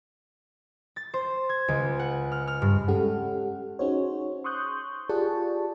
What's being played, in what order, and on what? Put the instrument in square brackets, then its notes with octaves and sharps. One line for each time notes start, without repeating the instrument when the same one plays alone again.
[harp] A6
C5
G#6
C#2
F#5
F6
F6
G2
[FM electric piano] G#3 C#4 G4 A4 F#5
C#4 D#4 F#4 G#4 C5 C#5
C6 C#6 D#6 F#6 G6
F4 G4 G#4 D5 A5 C#6